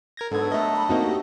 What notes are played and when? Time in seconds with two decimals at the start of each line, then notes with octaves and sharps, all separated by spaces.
0.17 A#4 G#6 A#6
0.31 G#2 D3 F#3 B3 A4 G#6
0.52 A3 A4 A#4 D#5 E5
0.76 B5
0.89 A#3 C4 D#4 F#4
1.05 G4